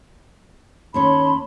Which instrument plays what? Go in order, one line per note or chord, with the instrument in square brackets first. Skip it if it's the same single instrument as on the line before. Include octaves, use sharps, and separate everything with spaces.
[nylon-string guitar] D#2 C#4 C#5 [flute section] A5 B5 C6